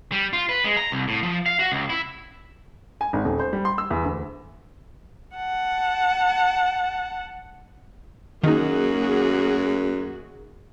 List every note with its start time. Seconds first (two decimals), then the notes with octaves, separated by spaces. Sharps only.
0.12 G3
0.33 F4
0.49 B4
0.64 G#3
0.77 A#5
0.92 C2
1.08 A2
1.23 F3
1.46 F5
1.59 F#4
1.72 C#2
1.90 E4
3.01 G#5
3.13 G#1
3.25 D#1
3.40 C5
3.53 G3
3.65 C6
3.78 E6
3.90 E2
4.04 D2
5.36 F#5 A5
8.44 F#2 D#3 A#3 D#4 F#4 G#4